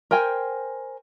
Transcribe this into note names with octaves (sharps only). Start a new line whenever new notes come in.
A#4 C5 G5 G#5